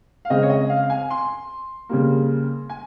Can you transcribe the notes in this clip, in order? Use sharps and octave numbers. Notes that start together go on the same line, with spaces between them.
F5
C#3 G#3 C4 D#5
C#5
D#5
F5
G#5
C6
C#3 G3 A#3
G#5